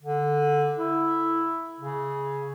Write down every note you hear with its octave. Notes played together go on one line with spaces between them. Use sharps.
D3
E4
C#3